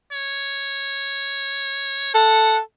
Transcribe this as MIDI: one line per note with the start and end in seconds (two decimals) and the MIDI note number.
0.12 2.14 73
2.15 2.60 69
2.15 2.56 78